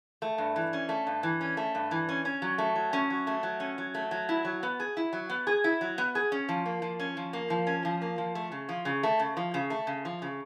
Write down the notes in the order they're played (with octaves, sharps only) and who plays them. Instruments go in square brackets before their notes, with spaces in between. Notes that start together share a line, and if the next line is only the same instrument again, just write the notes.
[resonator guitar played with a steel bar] A3
G2
E3
C#4
A3
G2
E3
C#4
A3
G2
E3
C#4
C#4
F#3
A3
F#3
C#4
F#3
A3
F#3
C#4
F#3
A3
F#3
E4
F#3
B3
G#4
E4
F#3
B3
G#4
E4
F#3
B3
G#4
C#4
F3
A#3
F3
C#4
F3
A#3
F3
C#4
F3
A#3
F3
A3
C#3
F3
C#3
A3
C#3
F3
C#3
A3
C#3
F3
C#3